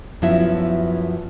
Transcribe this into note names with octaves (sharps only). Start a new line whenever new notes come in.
F#2 F3 B3 E4 F#4 E5